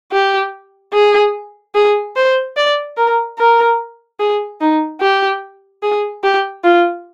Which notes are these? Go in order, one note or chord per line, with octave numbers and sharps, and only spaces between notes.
G4
G#4
G#4
C5
D5
A#4
A#4
G#4
D#4
G4
G#4
G4
F4